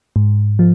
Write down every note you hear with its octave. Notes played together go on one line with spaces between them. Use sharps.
G#2
F3